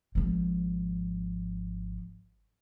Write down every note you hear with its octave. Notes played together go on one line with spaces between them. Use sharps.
G#1 F3